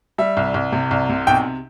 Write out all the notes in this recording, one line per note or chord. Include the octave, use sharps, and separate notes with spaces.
G3 E5
C2
C2
C3
C2
C3
B1 G5